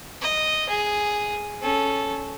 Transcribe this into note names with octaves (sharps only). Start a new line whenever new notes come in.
D#5
G#4
C#4 A4